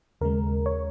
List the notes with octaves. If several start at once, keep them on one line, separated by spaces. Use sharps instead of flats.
D#2 C#3 G#3 A#4
C#5